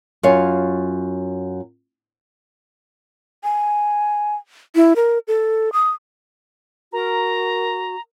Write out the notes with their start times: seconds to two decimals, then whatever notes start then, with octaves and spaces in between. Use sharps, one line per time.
0.23 F#2 F4 C#5 F5
3.44 G#5
4.75 E4
4.96 A#4
5.28 A4
5.73 D#6
6.93 F#4 A#4 A#5